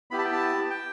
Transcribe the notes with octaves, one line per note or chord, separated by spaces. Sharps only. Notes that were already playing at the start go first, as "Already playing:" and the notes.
B3 E4 G4 B5
A5
G5
A5
G5